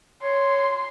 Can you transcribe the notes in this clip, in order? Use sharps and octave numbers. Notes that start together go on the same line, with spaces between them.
C#5 C6